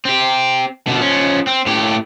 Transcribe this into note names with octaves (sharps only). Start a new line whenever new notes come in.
C4 G4
B2 D3
F3 C#4
C4
A2 G4